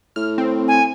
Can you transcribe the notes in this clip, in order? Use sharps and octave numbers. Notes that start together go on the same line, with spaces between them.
A2 F6
C4
G#5